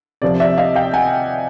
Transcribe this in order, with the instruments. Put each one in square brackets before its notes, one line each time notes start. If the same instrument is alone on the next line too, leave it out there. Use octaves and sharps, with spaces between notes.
[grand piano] C3 F3 D5
D5 E5
D#5 F5
F5 G5
F#5 G#5